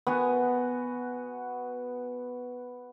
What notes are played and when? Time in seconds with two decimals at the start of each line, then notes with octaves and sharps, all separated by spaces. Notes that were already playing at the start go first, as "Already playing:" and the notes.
0.07 B3 F#4 G#5